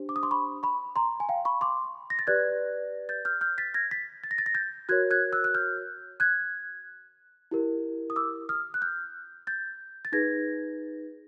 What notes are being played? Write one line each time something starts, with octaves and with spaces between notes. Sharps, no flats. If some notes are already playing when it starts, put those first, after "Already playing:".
Already playing: D4 G4 C5
D6
D#6
C6 D6
B5 C#6
B5 C#6
A#5 C6
G#5
F5 G5
B5 C#6
C6 D6
A#6
A6
G4 B4 D5 F#6 G#6
G6 A6
F6 G6
F6 G6
A6 B6
G#6 A#6
A6 B6
A6
A#6
A6
A#6
G6 A6
F#4 A#4 C#5 F#6 G#6
F#6 G#6
E6 F#6
F#6
F6 G6
F#6 G#6
E4 G4 A#4
D#6
D6 E6
D#6 F6
F#6
F6 G6
G6 A6
A6
D#4 G#4 B4 G#6 A#6